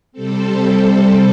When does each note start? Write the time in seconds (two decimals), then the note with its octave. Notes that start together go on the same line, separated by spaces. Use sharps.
0.12 C3 G3 C4 A4